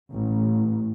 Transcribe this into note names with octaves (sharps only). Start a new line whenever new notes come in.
A1